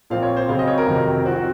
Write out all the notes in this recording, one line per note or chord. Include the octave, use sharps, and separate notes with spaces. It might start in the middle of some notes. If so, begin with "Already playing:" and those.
A#2 F3 C4 F5
C#5
C5
C#3 F#3 C4 F5
D#5
C#5
A#4
F2 C3 D#3 F#3
F3 C4 F#4
F#4